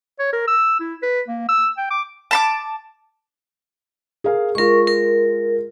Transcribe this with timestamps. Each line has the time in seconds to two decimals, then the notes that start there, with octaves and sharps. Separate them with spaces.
0.19 C#5
0.33 A#4
0.48 E6
0.80 E4
1.03 B4
1.28 A#3
1.49 E6
1.78 G5
1.90 D6
2.31 A5 B5 D6
4.24 G#4 A#4 F5
4.55 G#3 F4 A#4 C#6
4.87 A#4